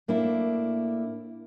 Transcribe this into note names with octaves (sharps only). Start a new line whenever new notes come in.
A2 A#3 D4 E4